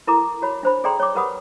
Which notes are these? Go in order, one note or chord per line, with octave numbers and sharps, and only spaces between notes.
E4 A4 A#4 A#5 D6
F#4 C#5 B5
D4 C5 B5
G#4 A4 D5 G5 A#5 C6
C#5 D6
G4 A#4 B4 F#5 B5 D#6